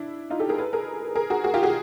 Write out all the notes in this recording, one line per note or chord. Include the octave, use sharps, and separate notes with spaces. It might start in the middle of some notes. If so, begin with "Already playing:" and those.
Already playing: D4 E4
D#4 F4
G4 A4
G#4 A#4
A4 B4
G#4 A#4
G#4 A#4
F#4 G#4
F#4 G#4
F4 G4
F#4 G#4